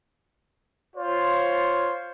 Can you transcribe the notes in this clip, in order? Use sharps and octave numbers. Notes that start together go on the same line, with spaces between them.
F4 C5 C#5